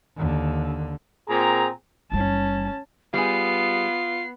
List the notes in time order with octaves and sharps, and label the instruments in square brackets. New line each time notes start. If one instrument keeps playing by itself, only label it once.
[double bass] D#2 D3
[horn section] A#2 C4 G#4 A#5
[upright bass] F#1 G3 [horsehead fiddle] C#4 A5
[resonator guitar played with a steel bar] G3 G#4 [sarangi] B3 [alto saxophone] F4 [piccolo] C7